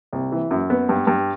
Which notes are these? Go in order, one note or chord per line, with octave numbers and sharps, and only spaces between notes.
C2
E3
F#2
B3
G2
G2